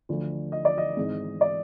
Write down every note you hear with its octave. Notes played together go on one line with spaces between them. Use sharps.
D2 D3 F3
D#5
D5
D#5
G#1 G#2 E3
D5